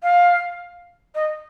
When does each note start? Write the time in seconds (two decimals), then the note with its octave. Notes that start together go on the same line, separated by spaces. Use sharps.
0.03 F5
1.15 D#5